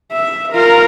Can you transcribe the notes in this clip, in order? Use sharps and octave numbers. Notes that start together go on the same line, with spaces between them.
E5
F4 A#4